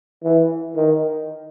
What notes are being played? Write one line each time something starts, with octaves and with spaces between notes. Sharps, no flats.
E3
D#3